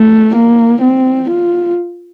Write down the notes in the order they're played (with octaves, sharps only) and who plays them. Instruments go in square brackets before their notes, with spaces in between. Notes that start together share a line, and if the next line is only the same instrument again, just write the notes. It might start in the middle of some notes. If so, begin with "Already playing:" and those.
Already playing: [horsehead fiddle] A3
A#3
C4
F4